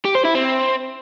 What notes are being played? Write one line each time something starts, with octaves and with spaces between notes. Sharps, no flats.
G4
C5
E4
C4